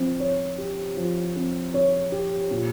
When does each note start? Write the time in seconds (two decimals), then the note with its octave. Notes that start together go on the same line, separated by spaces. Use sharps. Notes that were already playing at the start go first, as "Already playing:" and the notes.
Already playing: F3 C4
0.20 C#5
0.58 G4
0.97 F3
1.35 C4
1.74 C#5
2.12 G4
2.51 A#2